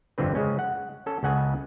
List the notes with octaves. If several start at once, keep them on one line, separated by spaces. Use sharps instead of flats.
G1 F2 D3 C4 B4
C#3 G#3 C#4
F#5
C#4 A4
C#2 C#3 F#5 G#5